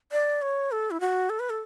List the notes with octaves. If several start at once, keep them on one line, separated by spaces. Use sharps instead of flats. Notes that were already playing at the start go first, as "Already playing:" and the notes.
D5
C#5
A4
E4
F#4
A4
B4
A4